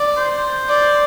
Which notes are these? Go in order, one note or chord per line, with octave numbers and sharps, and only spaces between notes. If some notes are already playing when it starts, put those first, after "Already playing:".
Already playing: D5
C5
D5